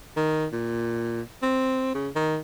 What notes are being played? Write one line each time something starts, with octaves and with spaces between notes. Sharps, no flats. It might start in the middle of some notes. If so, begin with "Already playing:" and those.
D#3
A#2
C4
C#3
D#3